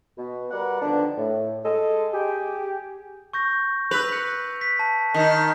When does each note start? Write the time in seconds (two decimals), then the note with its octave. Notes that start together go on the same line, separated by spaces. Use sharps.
0.18 B2
0.51 G3 A#4 B4 D5 F#5
0.82 D3 D#3 F3 B3 D4
1.17 A2
1.65 G#3 A4 D#5
2.13 G4 G#4
3.33 C#6 G6 A#6
3.91 B4 E6 F7
4.12 F#6 C#7
4.61 B6
4.79 A5
5.14 D#3